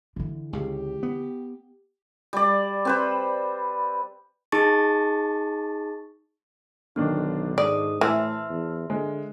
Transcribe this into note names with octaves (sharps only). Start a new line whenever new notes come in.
D3 E3
C#2 C#3 G4
B3
G3 D5
C4 B4 C5
D#4 G#4 A5 C#6 A6
B1 D3 D#3 B3 D4
G#2 D5 D#6
A2 E3 C5 E5 A5 C6 E6 F6
E2
D3 G#3